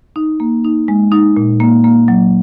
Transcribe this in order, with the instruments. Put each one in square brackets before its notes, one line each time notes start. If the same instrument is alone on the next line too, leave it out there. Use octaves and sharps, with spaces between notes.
[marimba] D#4
A#3
D#4
G#3
D#4
A#2
A#3
A#3
F#3